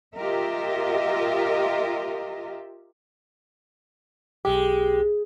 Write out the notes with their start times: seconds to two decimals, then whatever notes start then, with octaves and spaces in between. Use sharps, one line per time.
0.16 F4 G4 A#4 D#5 E5
4.45 B1 G#3 G4